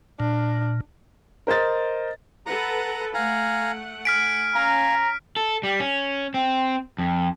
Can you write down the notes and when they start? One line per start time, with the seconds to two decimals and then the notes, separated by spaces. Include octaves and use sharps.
0.20 A#2 D4
1.47 A#4 C5 D#5 A6
2.46 A4 B4 F#5 A#5
3.14 A3 F5 F#5 G#5 A#5
4.05 G#5 F6 B6 D7
4.55 C#4 F5 G#5 A#5
5.36 A4
5.63 G3
5.80 C#4
6.34 C4
6.98 F2